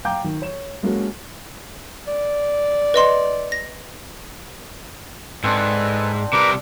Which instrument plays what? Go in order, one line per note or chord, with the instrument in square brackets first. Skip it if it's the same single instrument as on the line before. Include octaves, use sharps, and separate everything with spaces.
[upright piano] F5 G5 A#5 D6 G6
D#3
C#5 E7
G#3 A#3 C#4 F#4 A4 A#4
[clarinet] D5
[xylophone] B4 D#5 C6
A#6
[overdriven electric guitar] G#2 [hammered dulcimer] C4 D4 [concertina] A4 B4 G#5
[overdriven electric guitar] C3 G3 [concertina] A#4 B4 A#5 [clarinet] D6